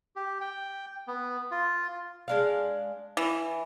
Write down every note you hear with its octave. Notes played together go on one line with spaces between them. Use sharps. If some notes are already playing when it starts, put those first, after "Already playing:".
G4
G5
B3
F4
G#3 D4 F5
E3